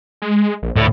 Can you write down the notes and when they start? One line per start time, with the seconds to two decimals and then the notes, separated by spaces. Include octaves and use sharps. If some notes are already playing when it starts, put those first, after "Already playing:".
0.22 G#3
0.62 A#1
0.77 D2 A2